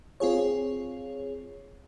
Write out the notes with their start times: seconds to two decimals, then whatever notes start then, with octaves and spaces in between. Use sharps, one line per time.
0.20 C4 F4 G#4 C#5